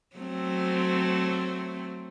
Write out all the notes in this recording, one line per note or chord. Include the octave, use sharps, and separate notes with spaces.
F#3 A3 C4